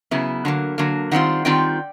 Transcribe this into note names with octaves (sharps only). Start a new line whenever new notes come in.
C#3 F#3 B3 E4
D3 F#3 A#3
D3 F#3 A#3
D#3 G3 C4 F4 F#5
D#3 G3 C4 F4 G5